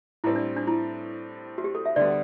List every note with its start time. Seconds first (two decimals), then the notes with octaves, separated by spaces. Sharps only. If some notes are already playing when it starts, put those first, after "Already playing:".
0.24 A2 G3 C4 E4
0.36 D4
0.56 D4
0.67 E4
1.58 F#4
1.64 G4
1.75 A4
1.86 E5
1.96 D2 D3 G3 B3 D5